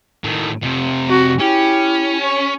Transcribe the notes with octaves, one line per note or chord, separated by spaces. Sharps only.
A2 D#3
F2 C3
C4 F#4
C#4 E4 G4
C#5 C#6